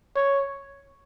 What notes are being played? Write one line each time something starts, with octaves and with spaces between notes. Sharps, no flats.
C#5